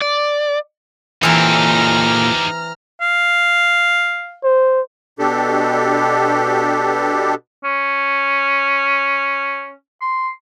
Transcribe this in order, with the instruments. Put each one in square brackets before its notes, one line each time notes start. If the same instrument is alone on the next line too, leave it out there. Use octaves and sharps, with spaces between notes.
[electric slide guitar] D5
[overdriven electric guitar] A#2 A4 [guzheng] E3 C4 [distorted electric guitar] D#4 G4 [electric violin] A#5 F6
[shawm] F5
[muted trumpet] C5
[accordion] B2 D4 G4 A4
[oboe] C#4
C6